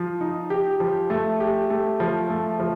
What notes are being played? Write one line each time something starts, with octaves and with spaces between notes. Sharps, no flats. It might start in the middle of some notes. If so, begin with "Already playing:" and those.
Already playing: F3
D#4
G4
F3
A3
G4
A3
F3
A3
F3